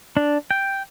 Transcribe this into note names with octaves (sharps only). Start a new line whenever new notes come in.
D4
G5